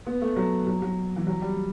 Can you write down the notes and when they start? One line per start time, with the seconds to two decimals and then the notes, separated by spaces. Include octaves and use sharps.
0.06 B3
0.22 A3
0.36 F#3
0.67 F#3
0.82 F#3
1.16 E3
1.27 F#3
1.42 G3